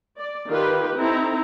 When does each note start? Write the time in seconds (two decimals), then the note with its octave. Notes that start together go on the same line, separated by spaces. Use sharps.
0.19 D5
0.51 D#3 F4 G4 B4
0.98 C4 D#4 E4 A4 A#5